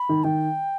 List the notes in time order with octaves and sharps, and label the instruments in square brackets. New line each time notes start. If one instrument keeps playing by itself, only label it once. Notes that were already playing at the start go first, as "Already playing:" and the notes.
Already playing: [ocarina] B5
[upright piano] D#3
[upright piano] D#3 [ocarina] G5